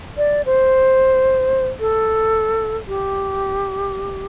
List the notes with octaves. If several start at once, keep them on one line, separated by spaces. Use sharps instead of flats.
D5
C5
A4
G4